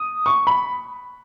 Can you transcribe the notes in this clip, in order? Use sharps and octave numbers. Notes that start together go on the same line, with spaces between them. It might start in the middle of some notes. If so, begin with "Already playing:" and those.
Already playing: D#6
C#6
B5